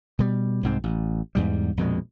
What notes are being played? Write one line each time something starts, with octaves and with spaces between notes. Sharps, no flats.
B2 G3
C2 G#2 C4
A1
E2 G#2 G3
A#1 F2 B2 G#3